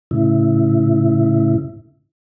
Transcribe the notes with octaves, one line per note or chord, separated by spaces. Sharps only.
A2 C#3 E4